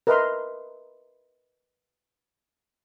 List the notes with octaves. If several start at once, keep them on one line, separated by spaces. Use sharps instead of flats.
A#4 B4 D#5 E5 A#5 C6